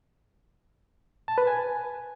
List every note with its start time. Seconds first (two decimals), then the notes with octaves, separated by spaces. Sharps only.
1.28 A5
1.38 B4
1.47 G#5